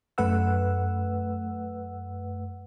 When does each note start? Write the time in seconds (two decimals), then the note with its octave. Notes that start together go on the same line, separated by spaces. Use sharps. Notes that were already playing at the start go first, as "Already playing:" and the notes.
0.18 F#2 A3 B4 F#5 E6